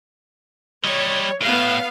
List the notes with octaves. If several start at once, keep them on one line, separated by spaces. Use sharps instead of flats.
G3 C#5 D#5
A2 B3 F5